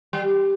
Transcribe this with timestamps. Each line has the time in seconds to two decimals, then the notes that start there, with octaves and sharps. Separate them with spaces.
0.13 G3